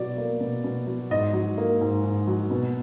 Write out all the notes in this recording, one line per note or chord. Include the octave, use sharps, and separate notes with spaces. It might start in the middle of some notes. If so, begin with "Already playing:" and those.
Already playing: B2 F#3 D5
A#3
B2
B2
F#3
G#2 D#5
F#3
A#3
G#2
G#2
F#3
B2